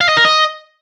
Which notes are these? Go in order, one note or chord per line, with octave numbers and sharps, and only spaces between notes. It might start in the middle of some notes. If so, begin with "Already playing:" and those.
F5
D#5
A#4
D#5